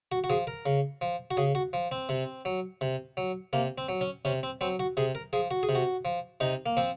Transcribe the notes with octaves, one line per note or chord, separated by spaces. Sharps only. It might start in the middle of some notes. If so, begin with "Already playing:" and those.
F#4
F#4
F3 G#4
A#4
C#3
F3
F#4
C#3 G#4
F#4
F3
C4
C3
F#3
C3
F#3
C3 A#3
C4
F#3
C#4
C3 C#4
C4
F#3 C4
F#4
C3 G#4
A#4
F3 G#4
F#4
G#4
C3
F#4
F3
C3 D#4
A#3
F3 C4